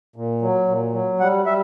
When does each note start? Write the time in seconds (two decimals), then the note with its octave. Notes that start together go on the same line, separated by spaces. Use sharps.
0.16 A#2
0.42 F#3
0.68 A#2
0.93 F#3
1.20 G3 F#5
1.46 G3 E5